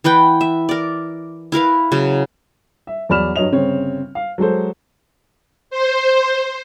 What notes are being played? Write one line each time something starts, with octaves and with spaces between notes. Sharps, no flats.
E3 B4 F#5 G5
E5
A#4 D5
E4 A#4 B4 F5
C#3 F#3
E5
E2 F#3 D5 B5 F6 E7
G2 F#3 C#5 D#5 F7
G1 C#3 C4 C#5
F5
F#3 G#3 A4 C5
C5